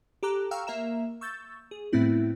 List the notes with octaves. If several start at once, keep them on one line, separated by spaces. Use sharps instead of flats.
G4 A4 A#5 D6 F#6
F5 G5 A#5 C#6 E6 F6
A#3 A#4 E5 A#5 E7
C#6 E6 G6 A6
G#4
A2 A3 B3 C4 E4